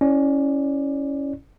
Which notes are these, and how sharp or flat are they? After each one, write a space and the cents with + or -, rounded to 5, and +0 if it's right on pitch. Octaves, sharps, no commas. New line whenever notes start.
C#4 +0 E4 -10 D5 +15